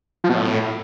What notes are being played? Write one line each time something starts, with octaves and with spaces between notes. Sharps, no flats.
F3
B2
A2